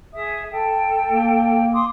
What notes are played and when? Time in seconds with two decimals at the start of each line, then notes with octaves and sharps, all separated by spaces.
0.13 G#4 E5 D#6
0.52 A4 G5
1.09 A#3
1.73 C6 D6 D#6